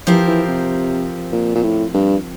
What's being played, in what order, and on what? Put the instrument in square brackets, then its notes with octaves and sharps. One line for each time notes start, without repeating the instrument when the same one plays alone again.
[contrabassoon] E3 [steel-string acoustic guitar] F3 C4 G4 A#4
[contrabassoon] E3
C3
A#2
A#2
A2
G2